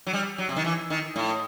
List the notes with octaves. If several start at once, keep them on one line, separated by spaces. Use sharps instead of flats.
F#3
G3
F#3
C3
D#3
E3
D#3
A2